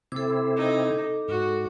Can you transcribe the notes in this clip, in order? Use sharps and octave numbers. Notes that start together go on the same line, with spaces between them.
C3 C4 E4 A4 D6
D#4
G#2 F#4